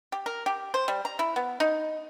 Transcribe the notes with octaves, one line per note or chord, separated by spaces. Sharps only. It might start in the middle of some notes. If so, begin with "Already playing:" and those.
G4
A#4
G4
C5
G3
A#5
E4
B3
D#4